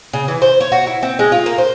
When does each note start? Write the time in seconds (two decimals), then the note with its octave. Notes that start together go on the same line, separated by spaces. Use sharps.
0.13 C#3
0.28 E3
0.42 C5
0.61 C#5
0.72 F#4
0.87 E4
1.03 C4
1.19 G#3
1.32 F4
1.46 A#3
1.58 C5